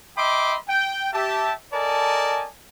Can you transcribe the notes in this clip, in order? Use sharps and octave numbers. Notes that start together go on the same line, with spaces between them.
D#5 E5 G5 B5 C6 D6
G5
G4 E5 A5
A4 A#4 D5 D#5 G#5 A5